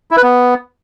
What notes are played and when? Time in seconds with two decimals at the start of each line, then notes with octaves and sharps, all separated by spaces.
0.11 E4
0.17 B4
0.23 B3